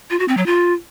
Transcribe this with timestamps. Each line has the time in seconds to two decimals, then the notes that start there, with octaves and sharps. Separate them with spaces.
0.10 F4
0.19 F#4
0.28 C4
0.37 F#3
0.46 F4